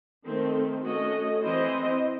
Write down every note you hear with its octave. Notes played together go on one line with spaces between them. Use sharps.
D#3 A3 C4 D#4 A4
A3 C#4 F#4 A4 D#5
E3 C4 E4 C5 D#5